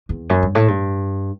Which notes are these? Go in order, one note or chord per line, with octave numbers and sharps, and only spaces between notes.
E2
F#2
G2
A2
G2